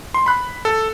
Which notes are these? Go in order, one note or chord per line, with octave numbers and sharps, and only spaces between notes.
C6
B5 F#6
A4